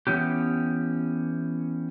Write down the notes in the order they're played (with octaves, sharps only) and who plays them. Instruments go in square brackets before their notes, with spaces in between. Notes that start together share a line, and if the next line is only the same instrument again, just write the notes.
[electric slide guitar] E3 B3 C#4 G4